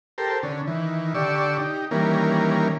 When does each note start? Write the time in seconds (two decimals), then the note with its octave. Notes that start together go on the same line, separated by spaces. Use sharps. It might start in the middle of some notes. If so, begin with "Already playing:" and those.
0.18 G4 A4 A#4 C5
0.43 D3 C#4
0.67 D#3 E3
1.15 D3 G4 D5 C#6 E6
1.58 D#4 G4
1.91 D#3 E3 G3 A#3 C#4 A#4